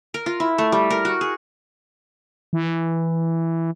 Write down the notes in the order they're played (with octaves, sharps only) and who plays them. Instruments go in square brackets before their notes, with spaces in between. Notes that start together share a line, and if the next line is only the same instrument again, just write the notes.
[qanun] A#4
F4
E4
A3
G3
A#4
F#4
G#4
[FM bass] E3